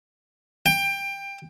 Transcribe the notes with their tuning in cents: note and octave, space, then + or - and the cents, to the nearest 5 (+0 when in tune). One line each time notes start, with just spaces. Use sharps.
G5 +20